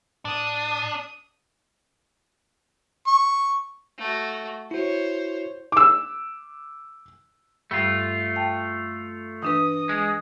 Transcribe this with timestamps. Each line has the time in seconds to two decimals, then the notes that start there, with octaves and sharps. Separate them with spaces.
0.25 A2 D4 D#6
3.07 C#6
3.98 A3 F#4
4.71 E4 F#4 C5 C#5
5.72 D6 E6
7.71 G2 G3 A3 F4
8.36 G5 A5
9.43 E3 D4 B4 D#6
9.89 G#3